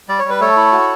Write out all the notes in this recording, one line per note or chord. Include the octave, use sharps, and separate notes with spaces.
G3 D5
C#5
G3 B4
A3 A4 C#5
E4
F#4